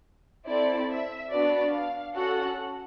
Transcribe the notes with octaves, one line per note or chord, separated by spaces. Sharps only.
C4 E4 A4 D5
E5
B3 D4 F#4 D5
F5
C#4 F#4 A4 F#5